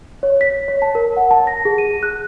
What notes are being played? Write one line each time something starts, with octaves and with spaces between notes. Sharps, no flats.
C#5
B6
C#5
A5
A#4
F#5
A5
A#6
G#4
D#7
F#6